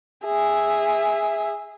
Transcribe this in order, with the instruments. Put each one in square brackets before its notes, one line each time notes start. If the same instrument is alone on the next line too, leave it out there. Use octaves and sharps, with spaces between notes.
[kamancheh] G#4 E5